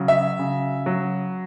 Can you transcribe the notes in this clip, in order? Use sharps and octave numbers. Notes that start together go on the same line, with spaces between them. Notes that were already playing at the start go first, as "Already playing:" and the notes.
Already playing: C#3 F#3
E5
C#3
F#3